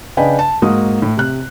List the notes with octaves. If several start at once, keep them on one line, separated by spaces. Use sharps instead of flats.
C#3 D4 B4 D#5 G5 G#5
A5
G#2 A#3 F#4 D#6
A2
C3 F#6